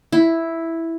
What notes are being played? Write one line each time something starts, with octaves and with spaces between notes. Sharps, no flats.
E4